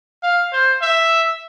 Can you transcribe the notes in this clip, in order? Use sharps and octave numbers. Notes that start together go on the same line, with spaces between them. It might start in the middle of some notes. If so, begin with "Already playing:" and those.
F5
C5
E5